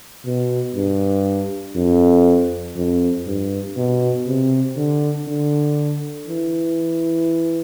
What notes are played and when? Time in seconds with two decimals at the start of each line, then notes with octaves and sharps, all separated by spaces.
0.26 B2
0.75 G2
1.76 F2
2.76 F2
3.27 G2
3.77 B2
4.27 C3
4.77 D3
5.27 D3
6.28 E3